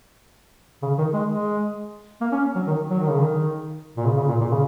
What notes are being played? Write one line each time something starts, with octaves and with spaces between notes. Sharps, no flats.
C#3
D#3
G#3
G#3
A#3
C#4
F#3
D#3
F#3
D#3
C#3
D#3
A#2
C#3
C#3
A#2
A#2
C#3